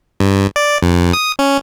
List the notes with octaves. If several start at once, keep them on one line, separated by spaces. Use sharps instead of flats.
G2
D5
F2
D#6
C#4